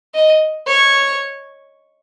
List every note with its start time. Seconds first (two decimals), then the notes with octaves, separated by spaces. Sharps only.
0.15 D#5
0.67 C#5